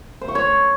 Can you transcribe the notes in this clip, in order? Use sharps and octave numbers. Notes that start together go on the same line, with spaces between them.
C5
C#6
C#5